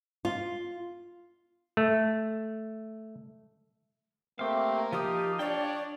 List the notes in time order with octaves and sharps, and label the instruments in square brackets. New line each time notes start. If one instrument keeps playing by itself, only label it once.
[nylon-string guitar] F4
[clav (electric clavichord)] A3
[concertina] A3 C4 [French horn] A#3 [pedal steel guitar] G4 F5
[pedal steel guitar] F3 D#4 D#6 [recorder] G4 [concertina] F5
[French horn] D4 [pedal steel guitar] C#5 G5 [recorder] D5